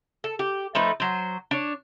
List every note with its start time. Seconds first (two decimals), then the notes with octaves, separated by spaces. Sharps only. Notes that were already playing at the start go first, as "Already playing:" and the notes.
0.24 A4
0.39 G4
0.75 F3 A3 D#4 B4
1.00 F#3 C5
1.51 D4 C#5